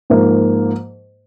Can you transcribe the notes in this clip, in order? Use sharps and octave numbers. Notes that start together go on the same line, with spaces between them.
G#2 F3 A#3